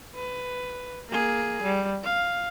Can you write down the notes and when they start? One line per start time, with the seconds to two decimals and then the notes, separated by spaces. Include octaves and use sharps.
0.15 B4
1.09 A#3 G#4
1.63 G3
2.04 F5